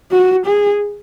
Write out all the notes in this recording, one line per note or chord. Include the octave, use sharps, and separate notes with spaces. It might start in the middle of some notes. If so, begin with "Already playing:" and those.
F#4
G#4